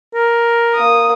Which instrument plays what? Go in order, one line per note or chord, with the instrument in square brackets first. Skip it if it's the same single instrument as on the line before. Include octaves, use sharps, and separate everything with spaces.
[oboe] A#4
[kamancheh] A#3 D#6